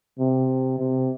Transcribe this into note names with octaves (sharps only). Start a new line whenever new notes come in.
C3
C3